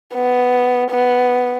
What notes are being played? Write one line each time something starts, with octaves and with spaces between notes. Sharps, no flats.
B3
B3